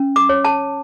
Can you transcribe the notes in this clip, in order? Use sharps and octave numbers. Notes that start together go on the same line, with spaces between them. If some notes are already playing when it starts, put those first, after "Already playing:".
Already playing: C#4
D6
C#5
A5